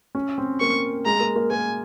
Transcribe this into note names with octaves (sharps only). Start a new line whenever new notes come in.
C#4
C4
A#3 C#6
G#3 A#5
A#3
A#3
A#3 G#5